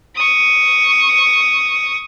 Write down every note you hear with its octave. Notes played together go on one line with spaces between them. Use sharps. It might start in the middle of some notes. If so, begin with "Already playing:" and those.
C#6 D#6